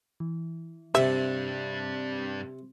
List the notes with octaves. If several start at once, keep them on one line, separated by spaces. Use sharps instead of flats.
E3
G2 C3 C4 D4 E5